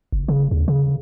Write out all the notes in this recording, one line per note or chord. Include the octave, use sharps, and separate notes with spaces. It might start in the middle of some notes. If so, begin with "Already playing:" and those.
F#1
C#3
D#2
C#3